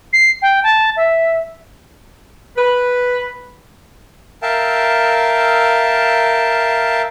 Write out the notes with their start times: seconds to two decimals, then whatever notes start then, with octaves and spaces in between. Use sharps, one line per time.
0.13 C7
0.42 G5
0.63 A5
0.97 E5
2.57 B4
4.42 A#4 E5 F5 G5 A5